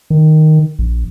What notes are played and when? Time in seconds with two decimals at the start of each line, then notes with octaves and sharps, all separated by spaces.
0.10 D#3
0.79 A#1